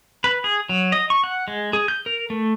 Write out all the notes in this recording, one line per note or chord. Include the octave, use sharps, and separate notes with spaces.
B4
G#4
F#3
D#5
C#6
F#5
G#3
G#4
G6
A#4
A3